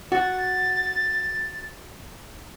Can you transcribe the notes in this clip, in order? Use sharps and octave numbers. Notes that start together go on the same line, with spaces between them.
F#4 A6